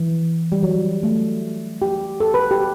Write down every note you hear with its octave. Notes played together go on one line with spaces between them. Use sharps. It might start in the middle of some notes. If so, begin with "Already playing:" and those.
Already playing: E3
G3
F#3
A3
G4
A4
B4
G4